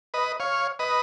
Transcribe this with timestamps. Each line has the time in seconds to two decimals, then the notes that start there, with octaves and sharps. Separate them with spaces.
0.14 B4 D#5
0.40 C#5 F5
0.79 B4 D#5